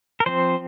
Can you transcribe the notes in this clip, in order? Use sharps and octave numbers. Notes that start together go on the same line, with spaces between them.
A#4
F3 C4 C5